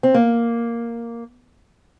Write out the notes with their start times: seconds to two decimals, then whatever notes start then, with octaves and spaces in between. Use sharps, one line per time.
0.03 C4
0.14 A#3